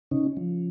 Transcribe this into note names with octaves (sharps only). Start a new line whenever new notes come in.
C#3 C#4 D#4
F3